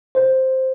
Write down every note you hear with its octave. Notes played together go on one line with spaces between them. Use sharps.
C5